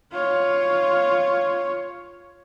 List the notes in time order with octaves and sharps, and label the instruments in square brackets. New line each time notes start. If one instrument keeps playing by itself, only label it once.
[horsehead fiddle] F4 C#5